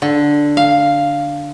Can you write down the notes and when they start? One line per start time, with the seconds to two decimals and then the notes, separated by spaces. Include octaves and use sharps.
0.02 D3
0.57 F5